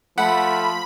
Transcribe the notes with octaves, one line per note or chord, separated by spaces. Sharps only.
F3 A3 F#5 B5